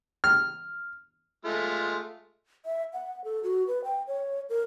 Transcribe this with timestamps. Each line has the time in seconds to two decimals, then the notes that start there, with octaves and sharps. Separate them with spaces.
0.24 F6
1.45 G#3 A3 F4
2.65 E5
2.93 F#5
3.24 A4
3.43 F#4
3.67 B4
3.84 G5
4.07 C#5
4.49 A#4